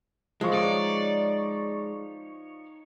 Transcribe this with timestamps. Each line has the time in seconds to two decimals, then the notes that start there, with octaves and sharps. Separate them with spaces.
0.41 F3 G#3 F5 C#6
0.54 D#4 C#5 D5